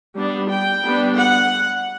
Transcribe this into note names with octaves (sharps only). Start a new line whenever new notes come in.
G3 B3 D4
G5
G3 B3 D4
F#5